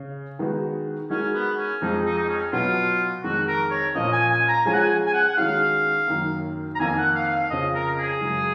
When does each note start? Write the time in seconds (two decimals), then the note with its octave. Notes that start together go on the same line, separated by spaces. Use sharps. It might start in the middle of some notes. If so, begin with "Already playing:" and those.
Already playing: C#3
0.39 D#3 G#3 B3 D#4 F#4
1.10 G#3 C#4 D#4 F#4 A#4
1.34 B3
1.57 C#4
1.81 F2 F3 G#3 D#4
2.05 D#4
2.17 D#4
2.28 C#4
2.52 B2 F#3 B3 F4 F#4 B4
3.23 F2 D#3 G#3 F#4
3.48 A#4
3.71 C#5
3.95 A#2 F3 A#3 C#4 D#5
4.12 G#5
4.31 G#5
4.48 A#5
4.65 F3 G#3 C#4 F4 G#4 G#5
4.73 F#5
4.80 G#5
5.07 G#5
5.14 F#5
5.28 F#5
5.37 D#3 G#3 C#4 F#4 F5
6.08 F#2 D#3 A#3
6.75 A#5
6.79 F2 D#3 A#3 G#5
6.98 F#5
7.15 F5
7.32 F5
7.50 F2 C#3 F3 D#5
7.75 A#4
7.98 G#4
8.21 F#2 C#3 G#3